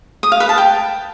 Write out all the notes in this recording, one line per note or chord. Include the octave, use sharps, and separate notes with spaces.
D#6
F5
B4
A5
G5